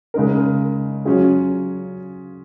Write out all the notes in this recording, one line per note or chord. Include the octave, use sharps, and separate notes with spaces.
C#3 G#3 D#4 A#4
F#3 C#4 F4 G#4